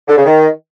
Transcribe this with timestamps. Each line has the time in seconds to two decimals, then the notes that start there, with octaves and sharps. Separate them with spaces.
0.08 D3
0.17 C#3
0.25 D#3